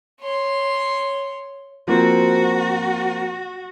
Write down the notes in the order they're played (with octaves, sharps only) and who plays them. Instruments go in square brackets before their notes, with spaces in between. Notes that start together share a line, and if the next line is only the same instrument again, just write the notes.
[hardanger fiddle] C#5 C6
[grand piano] F3 A#3 C4 [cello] F#4